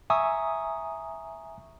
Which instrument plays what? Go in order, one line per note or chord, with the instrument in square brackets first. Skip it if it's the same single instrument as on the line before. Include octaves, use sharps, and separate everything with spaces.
[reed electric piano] E5 G#5 A#5 C#6 D#6 E6